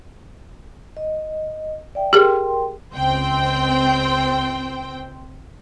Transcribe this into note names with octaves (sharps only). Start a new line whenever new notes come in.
D#5
D5 E5 G5
G4 G#4 A#4 G5 C6
C#2 C4 C5 G5